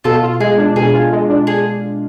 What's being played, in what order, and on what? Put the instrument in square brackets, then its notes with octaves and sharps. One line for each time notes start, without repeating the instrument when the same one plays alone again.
[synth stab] B2 [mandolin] F4 A4
[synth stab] F4
[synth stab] G#3 [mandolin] G#4
[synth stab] D4
[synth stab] B2 [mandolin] G#4
[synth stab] F4
G#3
D4
[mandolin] G#4